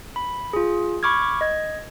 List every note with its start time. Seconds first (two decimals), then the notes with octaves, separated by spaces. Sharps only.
0.16 B5
0.53 F4 G#4
1.03 B5 C#6 D6 F6 G#6
1.41 D#5 G#6